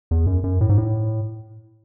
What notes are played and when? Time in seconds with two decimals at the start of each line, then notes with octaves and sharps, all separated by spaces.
0.11 E2
0.27 F#2
0.44 F#2
0.61 A2
0.69 G#2
0.78 A2